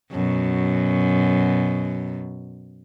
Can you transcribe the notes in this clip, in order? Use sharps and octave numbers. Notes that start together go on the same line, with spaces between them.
F#2 B2